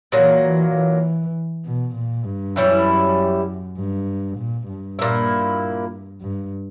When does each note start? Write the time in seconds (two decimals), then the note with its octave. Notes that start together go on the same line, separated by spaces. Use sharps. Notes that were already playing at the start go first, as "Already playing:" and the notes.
0.12 A#2 E3 F#3 A#3
0.43 E3
0.73 E3
1.65 B2
1.95 A#2
2.25 G2
2.55 F#2 E3 G3 C#4 E4
3.77 G2
4.38 A#2
4.69 G2
4.99 A#2 A#3 E4
6.21 G2